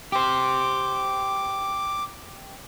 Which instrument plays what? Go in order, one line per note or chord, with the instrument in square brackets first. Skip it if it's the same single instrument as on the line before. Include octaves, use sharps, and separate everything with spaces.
[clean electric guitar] G4 C5 [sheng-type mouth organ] D6